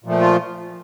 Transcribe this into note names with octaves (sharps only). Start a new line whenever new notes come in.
A#2 F3 A3
F4